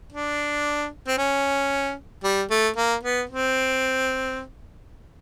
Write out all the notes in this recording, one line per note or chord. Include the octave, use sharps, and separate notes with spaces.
D4
C4
C#4
G3
A3
A#3
B3
C4